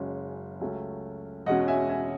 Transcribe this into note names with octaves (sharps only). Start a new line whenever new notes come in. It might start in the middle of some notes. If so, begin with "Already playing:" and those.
Already playing: F#1 F#2 C#3 G#3 C#4
C#2 C#3 F#3 A3 C#4
E1 E2 B2 G#3 C#4 D#5 F#5
E5 G#5
E5 G#5